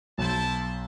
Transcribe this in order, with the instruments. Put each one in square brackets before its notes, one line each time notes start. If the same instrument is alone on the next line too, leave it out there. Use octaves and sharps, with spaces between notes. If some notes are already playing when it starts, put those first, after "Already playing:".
[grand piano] B1 [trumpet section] E4 C5 A5